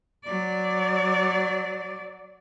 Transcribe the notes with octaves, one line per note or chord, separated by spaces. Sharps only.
F#3 D5